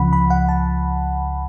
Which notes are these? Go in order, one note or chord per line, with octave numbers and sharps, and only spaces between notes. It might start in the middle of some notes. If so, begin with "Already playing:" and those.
Already playing: C#2 C#3 F3 F#5 B5
B5
F#5
A5